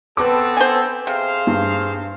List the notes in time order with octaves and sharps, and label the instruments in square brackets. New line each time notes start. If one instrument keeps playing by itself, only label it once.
[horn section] B3 C4 A4 [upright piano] B4 D6
[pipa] C5 G#5
[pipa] C3 [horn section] G#4 C5 F5
[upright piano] G2